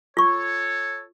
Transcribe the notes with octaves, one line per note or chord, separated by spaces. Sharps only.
F4 A4 C#5 C#6